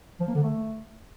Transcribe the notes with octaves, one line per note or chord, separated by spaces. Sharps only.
F3
A#3
D3
A3